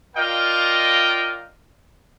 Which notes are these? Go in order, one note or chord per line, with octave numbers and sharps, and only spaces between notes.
F4 A#4 D5 D#5 F5 G5